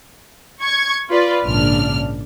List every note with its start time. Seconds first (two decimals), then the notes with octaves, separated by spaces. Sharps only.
0.61 C#6 G#6
1.10 F4 B4 D5
1.43 A#1 G#2 C#3 D4 F6